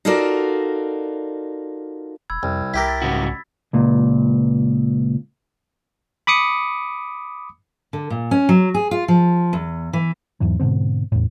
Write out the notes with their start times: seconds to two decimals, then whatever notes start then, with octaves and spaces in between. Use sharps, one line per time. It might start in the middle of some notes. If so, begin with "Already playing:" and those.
0.05 D#4 F4 F#4 A4 A#4 D5
2.30 E1 B5 E6 G#6
2.43 C2 F2
2.74 C2 E4 G4 A#4 B6
2.88 A6
3.02 G#2 C#3 F#4
3.73 C#2 A#2
6.27 B5 D6 D#6 C#7
7.93 D3
8.10 A#2
8.31 C#4
8.49 F#3
8.74 G#4
8.91 F4
9.08 F3
9.53 E2
9.93 E3
10.40 E2 G#2 E3 F#3
10.60 G#2 B2 D3 C4
11.12 E2 A2